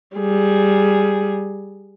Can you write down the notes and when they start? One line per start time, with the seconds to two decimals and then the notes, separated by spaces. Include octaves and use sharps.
0.17 G3 G#4